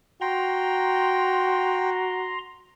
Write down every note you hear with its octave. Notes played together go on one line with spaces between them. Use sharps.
F#4 G5 A#5 C6